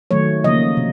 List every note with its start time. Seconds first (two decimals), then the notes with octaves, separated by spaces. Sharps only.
0.11 D#3 F#3 A3 C#5
0.44 C#3 F3 A#3 D#5
0.77 C3